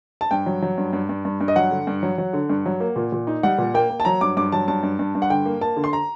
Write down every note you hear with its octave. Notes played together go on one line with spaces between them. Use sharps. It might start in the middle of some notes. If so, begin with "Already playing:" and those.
A5
G2 G5
F#3
F#3
G2
G2
G2
G2
G2
D#5
F#3 F#5
D3
G2
F#3
F#3
D3
G2
F#3
A#3
A#2
A#2
D#4
G3 F#5
A#2
A#3 G5
A#3
A5
F#3 A#5
G2 D6
G2 D6
F#3 A5
G2 A5
G2
G2
G2
F#5
D3 G5
A#3
A#3 A5
D3
C6
A#5